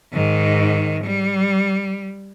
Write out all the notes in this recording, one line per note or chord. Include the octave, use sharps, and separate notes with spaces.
G#2 D#3
G3